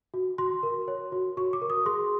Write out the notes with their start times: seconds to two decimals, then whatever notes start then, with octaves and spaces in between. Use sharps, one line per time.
0.14 F#4
0.38 F#4 C6
0.63 A#4
0.88 C#5
1.12 F#4
1.37 F#4 C#6
1.53 D6
1.62 A#4
1.70 D#6
1.86 G#4 C6